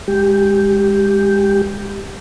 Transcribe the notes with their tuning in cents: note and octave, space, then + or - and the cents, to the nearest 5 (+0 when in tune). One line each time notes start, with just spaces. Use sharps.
G#3 -25 G4 +0